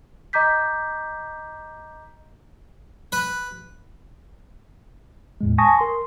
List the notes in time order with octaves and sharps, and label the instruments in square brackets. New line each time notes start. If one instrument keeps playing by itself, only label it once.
[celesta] D#5 A#5 D6 G6 B6
[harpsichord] B4
[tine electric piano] E2 A2 G#3
G#5 A5 C#6 D#6 A#6
A#4 C6